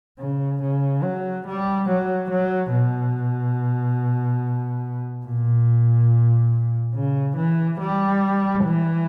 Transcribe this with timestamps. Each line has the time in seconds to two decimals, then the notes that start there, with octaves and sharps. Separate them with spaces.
0.19 C#3
0.62 C#3
1.03 F#3
1.46 G3
1.88 F#3
2.30 F#3
2.72 B2
5.25 A#2
6.94 C#3
7.36 E3
7.79 G3
8.64 E3